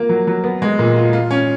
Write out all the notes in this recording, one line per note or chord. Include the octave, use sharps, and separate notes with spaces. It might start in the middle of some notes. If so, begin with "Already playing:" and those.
Already playing: A#3 F4
F#3
F#3
B3
G#3
A#2
F4
F4
C#4